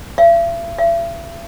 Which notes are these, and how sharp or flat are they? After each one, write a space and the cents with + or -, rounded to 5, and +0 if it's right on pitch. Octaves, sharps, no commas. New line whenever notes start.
E5 +45
E5 +40